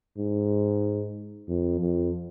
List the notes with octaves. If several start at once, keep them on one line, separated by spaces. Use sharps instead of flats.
G#2
F2
F2